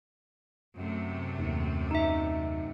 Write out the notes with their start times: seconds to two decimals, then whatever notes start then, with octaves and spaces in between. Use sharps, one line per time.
0.76 F#2 C3 A3
1.39 D#2
1.91 D#4 E5